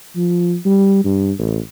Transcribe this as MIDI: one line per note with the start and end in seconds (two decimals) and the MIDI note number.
0.16 0.56 53
0.66 1.05 55
1.05 1.32 43
1.38 1.58 33